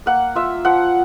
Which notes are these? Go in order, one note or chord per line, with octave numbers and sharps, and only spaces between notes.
A#3 F#5
F4 E5
F3 F#5